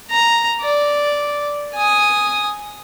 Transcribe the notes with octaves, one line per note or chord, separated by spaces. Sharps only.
A#5
D5
G#5 D#6